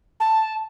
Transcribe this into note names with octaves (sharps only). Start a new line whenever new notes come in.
A5